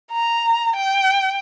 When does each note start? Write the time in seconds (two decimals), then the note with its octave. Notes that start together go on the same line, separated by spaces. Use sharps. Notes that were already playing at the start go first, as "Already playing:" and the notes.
0.11 A#5
0.76 G5